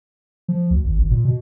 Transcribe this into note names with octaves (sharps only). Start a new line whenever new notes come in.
F3
D2
G#1
G#1
A#2
B2